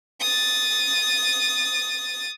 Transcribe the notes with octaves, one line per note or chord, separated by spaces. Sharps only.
D#6 A6